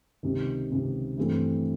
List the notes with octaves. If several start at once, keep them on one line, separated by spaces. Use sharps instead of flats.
C#2 C3 D#3
C#2 C3 D#3
G2 E3 A3 C4